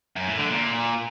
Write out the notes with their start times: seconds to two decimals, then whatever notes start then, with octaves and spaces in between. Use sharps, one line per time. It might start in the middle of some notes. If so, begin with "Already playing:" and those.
0.16 F#2
0.27 A2
0.38 D3
0.48 A#2